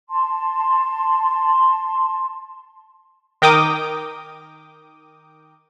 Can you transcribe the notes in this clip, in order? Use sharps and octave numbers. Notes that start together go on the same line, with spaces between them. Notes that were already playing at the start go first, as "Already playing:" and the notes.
A5 C6
D#3 A#4 G5 D6 D#6